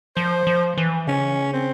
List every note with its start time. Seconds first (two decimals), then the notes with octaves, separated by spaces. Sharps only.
0.16 F3 C5
0.47 F3
0.78 E3
1.07 C#3 C#4
1.53 C4